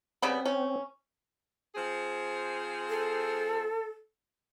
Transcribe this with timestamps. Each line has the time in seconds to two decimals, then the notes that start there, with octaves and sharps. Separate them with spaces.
0.22 C#3 G3 B3 C4
0.45 C#4
1.75 F3 C4 G#4
2.89 A4